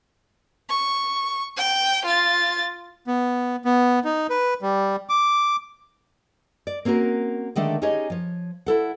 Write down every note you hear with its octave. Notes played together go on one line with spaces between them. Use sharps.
C#6
G5
F4 A6
B3
B3
D#4
B4
G3
D6
D5
A#3 C4 C#4 F#4 A#4
D3 D#3 G#3 A3 D4
C#4 D#4 G4 G#4 C#5 D#5
F3 C#5
E4 A4 F#5